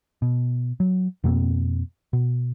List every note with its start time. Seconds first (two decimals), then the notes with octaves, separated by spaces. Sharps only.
0.22 B2
0.80 F#3
1.24 F2 B2 A#3 C4
2.13 B2